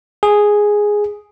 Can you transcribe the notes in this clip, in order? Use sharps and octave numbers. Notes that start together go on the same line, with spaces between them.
G#4